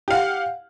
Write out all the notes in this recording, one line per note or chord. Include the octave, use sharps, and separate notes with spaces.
G4 F5 F#5